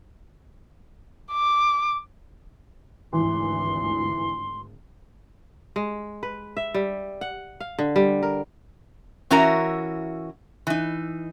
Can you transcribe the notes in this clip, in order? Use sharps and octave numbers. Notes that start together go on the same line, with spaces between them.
D6
G#1 D2 E3 C6
G#3
B4
E5
G3
F#5
F5
D3
G3
A#4
E3 C#4 E4 F#4 A#4 A#5
E3 D#4